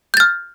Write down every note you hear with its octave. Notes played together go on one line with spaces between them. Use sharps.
F6 G6 A6